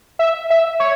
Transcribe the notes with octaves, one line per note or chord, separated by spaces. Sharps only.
E5
E5
C#5